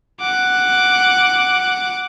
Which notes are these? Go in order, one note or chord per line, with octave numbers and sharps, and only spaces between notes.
F#5 D6